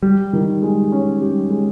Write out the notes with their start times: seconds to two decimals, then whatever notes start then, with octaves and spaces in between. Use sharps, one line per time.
0.03 G3 G4
0.33 D#3
0.62 G#3
0.92 C#4
1.21 G4
1.50 G#3